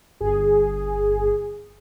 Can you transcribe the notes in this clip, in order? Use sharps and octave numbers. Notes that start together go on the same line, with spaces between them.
G1 G#4